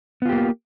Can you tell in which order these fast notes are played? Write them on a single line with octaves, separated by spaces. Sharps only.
B3 F4 G4 A#3